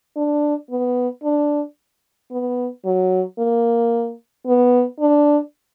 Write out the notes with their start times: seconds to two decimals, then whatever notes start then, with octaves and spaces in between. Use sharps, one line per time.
0.17 D4
0.70 B3
1.24 D4
2.31 B3
2.85 F#3
3.39 A#3
4.46 B3
5.00 D4